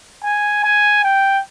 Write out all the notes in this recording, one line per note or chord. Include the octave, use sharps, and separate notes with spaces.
G#5
G#5
G5